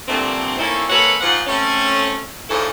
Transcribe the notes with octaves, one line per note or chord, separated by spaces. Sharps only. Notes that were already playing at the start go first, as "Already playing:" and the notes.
G2 A#2 D3 A3 C4
A3 A#3 C4 C#4 D#4 E4
G#3 A#3 A4 B4 C#5 F#5
G#2 F3 F4 F#5
A3 C4 C#4
G#2 D3 F3 C#4 E4 A4